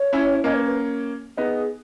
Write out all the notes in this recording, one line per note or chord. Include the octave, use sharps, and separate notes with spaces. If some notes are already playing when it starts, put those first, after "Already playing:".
Already playing: C#5
C#4 E4
A#3 C#4 D#5
B4
B4
B3 D#4 G#4